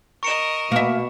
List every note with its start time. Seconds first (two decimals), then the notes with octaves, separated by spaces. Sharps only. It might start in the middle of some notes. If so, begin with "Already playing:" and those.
0.23 A#4 D#5 C#6 C#7 E7
0.72 B2 A#3 E5